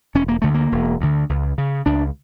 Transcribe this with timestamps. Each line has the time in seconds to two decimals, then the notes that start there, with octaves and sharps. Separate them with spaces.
0.15 E1 C#4
0.28 A#3
0.42 D2 D3 A3
0.54 A#3
0.72 E1
1.01 D2 D3
1.29 C#2
1.58 C#3
1.86 C#2 D4